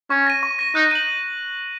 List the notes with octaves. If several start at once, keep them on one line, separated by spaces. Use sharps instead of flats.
C#4 C#6
A#6 D#7
C#6
A#6 D#7
D#4 F#6
D#7 F#7